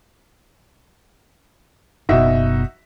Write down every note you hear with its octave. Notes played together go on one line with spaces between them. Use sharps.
F#1 B2 D#4 F#4 E5